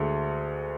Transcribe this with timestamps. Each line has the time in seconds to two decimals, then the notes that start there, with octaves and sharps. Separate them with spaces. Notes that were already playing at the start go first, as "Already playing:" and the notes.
Already playing: D2 D3 G#3